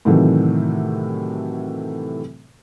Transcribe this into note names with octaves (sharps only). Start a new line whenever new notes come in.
A2 C3 D#3 E3 F#3 A3